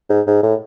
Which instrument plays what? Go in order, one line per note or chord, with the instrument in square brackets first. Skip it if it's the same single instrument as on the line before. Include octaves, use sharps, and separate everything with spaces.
[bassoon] G#2
G#2
A2